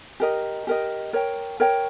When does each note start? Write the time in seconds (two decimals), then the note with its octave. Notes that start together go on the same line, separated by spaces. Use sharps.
0.20 G4 A#4 D#5
0.67 G4 A#4 D#5
1.13 A#4 C#5 G5
1.60 A#4 C#5 G5